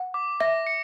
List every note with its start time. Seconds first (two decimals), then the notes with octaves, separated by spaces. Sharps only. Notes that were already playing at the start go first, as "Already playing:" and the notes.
Already playing: F#5
0.14 D6
0.40 E5 A#6
0.67 C#7